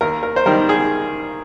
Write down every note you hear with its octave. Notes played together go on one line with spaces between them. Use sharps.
D#2 A#4
A#4
C5
D#3 G3 A#4
G#4